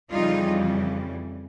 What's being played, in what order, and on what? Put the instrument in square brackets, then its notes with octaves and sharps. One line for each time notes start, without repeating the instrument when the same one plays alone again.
[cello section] F2 C#3 E3 G3 D#4 F4